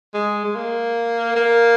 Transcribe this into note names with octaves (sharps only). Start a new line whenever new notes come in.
G#3
G#3
A#3
A#3